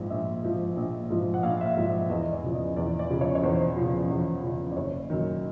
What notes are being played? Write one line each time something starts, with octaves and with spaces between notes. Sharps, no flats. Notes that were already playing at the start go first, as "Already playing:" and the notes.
Already playing: A#1 G#2 F3
A#1 E5
G#2 F3
A#1
G#2 F3
F#5
A#1 F5
E5
F5
G#2 F3
E5
E2 D#5
D5
C#3 F3
D#5
E2 D5
D5
C#3 F3
C#5
C#5
E2 C5
C#3 F3
E2
C#3 F3
D5
F#1 C#5
F#2 D#3